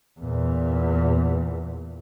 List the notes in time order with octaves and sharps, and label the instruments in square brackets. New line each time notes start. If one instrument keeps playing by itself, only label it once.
[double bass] E2 A#2